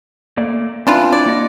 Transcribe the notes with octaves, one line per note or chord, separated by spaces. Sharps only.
A3 A#3 D5
E3 C4 D4 F4
E4 D5
A#3 F#4 D#5